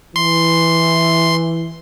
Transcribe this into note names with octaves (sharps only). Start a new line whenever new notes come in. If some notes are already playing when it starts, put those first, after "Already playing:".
E3 C6